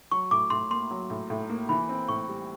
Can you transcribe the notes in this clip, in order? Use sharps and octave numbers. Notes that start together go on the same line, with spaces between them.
F#3 C#6
A2 D6
A2 C6
A#3 C6
F#3
A2
A2
A#3
E3 B5
C4
A2 C#6
G3